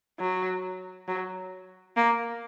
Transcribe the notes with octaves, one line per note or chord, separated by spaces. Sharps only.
F#3
F#3
A#3